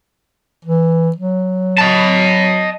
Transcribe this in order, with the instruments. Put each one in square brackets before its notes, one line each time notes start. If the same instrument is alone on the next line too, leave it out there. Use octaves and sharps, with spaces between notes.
[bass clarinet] E3
F#3
[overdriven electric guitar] D#5 A5